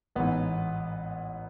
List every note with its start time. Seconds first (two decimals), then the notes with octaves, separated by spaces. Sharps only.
0.15 A1 G#2 E3 B3